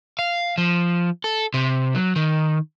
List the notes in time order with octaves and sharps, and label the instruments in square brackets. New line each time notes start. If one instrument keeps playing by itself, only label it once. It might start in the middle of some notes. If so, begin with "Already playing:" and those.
[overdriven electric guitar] F5
F3
A4
C3
F#3
D#3